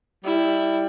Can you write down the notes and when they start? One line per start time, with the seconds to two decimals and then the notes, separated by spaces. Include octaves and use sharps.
0.25 G3 E4